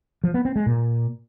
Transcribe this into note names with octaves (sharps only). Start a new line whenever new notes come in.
F3
B3
C4
G#3
A#2